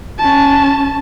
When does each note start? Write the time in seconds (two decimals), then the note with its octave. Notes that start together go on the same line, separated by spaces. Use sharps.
0.19 C#4 A5